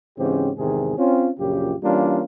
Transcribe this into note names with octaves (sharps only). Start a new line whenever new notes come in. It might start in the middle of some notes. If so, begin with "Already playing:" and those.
G#2 C#3 E3 C4 C#4 G4
E2 G#2 C3 D#3 G#4
C4 C#4 F4
A#1 F#2 C#3 F4 G4
E3 G3 A#3 C#4 D4 F4